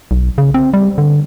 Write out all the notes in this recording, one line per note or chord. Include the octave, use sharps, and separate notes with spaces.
B1
C#3
C4
G3
D3